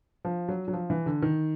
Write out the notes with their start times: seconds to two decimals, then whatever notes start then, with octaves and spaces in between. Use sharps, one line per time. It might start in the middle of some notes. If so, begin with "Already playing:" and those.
0.25 F3
0.48 F#3
0.68 F#3
0.73 F3
0.90 E3
1.06 D3
1.22 D#3